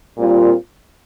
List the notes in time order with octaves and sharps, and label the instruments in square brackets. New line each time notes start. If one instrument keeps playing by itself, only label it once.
[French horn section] A#2 G3 C4 F4 A#4